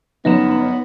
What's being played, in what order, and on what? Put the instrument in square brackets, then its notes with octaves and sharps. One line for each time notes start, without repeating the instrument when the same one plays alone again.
[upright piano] G1 F#2 E7 [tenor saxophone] B3 [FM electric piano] D#4